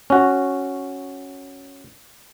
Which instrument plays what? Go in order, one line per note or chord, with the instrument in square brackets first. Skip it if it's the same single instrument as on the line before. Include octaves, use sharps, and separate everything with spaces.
[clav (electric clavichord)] C#4 F#4